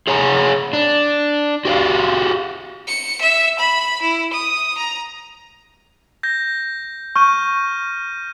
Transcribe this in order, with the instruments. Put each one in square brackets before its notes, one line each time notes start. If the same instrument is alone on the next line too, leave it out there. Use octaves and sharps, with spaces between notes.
[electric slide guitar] G#4 C#5 F#5 G#5 A#5
D4
F#4 G4 D5 F5
[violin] C#7
E5
B5
E4
D#6
A#5
[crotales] G6 A#6
[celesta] C#6 [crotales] F6 G6 D#7